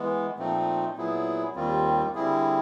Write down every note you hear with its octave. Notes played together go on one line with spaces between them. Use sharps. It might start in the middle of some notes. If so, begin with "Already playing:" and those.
Already playing: E3 G#3 B3
A#2 F3 A3 C4 D#4
A#2 F#3 B3 E4 G#4
D#2 D#3 G3 C4 F4
D3 G3 C4 E4 G#4